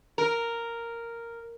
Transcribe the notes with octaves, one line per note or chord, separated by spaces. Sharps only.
A#4